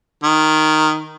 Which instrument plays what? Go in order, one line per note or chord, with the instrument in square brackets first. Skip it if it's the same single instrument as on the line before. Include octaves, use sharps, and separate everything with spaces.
[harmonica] D#3